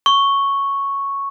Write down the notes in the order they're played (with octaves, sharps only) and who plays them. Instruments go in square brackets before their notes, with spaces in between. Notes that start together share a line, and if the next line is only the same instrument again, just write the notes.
[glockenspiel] C#6